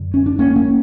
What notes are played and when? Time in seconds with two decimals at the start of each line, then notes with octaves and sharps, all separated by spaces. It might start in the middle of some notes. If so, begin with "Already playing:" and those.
Already playing: F#2 D3
0.14 C#4
0.26 D4
0.39 A#3 C#4
0.56 A#3 C#4